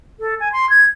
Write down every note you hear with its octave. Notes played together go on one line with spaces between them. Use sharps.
A4
G#5
C6
G#6